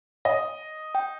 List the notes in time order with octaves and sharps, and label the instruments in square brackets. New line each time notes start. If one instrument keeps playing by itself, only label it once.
[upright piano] D#5
[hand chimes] G5